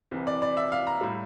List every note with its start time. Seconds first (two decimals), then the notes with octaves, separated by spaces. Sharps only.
0.11 C2 C3 E3
0.27 D5
0.42 D5
0.57 E5
0.72 F5
0.87 A#5
1.01 A2 G3